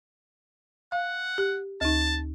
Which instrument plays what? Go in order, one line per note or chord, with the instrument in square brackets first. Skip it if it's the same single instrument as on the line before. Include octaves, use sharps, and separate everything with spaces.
[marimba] F5 [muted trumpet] F#5
[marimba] G4
[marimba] D2 D#4 [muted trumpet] A5